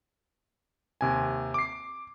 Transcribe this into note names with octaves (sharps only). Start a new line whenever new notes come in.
D#2 C3 G#5
D6 C7